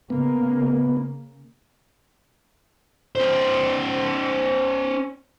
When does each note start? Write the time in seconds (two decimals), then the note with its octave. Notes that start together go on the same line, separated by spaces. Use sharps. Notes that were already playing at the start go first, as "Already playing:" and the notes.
0.10 C#3 A#3 B3
3.16 C#4 C5